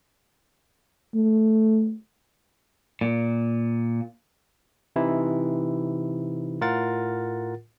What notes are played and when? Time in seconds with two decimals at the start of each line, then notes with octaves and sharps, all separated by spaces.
1.15 A3
3.01 A#2
4.96 C3 E3 D#4 E4
6.61 A2 F4 A#4 F#5 A6